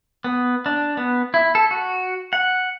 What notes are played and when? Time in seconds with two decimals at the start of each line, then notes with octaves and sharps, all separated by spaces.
0.24 B3
0.66 D4
0.97 B3
1.34 E4
1.55 A4
1.71 F#4
2.33 F#5